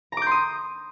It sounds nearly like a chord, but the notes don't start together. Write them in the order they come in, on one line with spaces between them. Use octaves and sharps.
A#5 D6 G6 C6 D#6